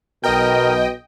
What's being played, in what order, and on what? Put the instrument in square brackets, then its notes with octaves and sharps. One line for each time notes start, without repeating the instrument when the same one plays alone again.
[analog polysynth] B1 D#5 G5 [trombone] B2 [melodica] A#4